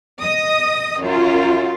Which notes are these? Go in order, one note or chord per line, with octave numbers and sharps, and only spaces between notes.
D#5 D#6
F#2 F4